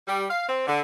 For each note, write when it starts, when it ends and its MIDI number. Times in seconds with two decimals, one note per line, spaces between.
0.08 0.24 55
0.29 0.45 77
0.49 0.63 60
0.67 0.82 50